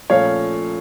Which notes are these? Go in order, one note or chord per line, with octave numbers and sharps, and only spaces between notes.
A#2 F3 A3 C#4 C#5 F5